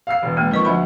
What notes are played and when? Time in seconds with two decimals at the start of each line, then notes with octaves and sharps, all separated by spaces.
0.07 F5 E6 C7
0.22 E1 E2
0.37 G#3 A#3
0.51 D#3 F3 C4 B4 D#5 C#6
0.65 D2 F3 E5 B5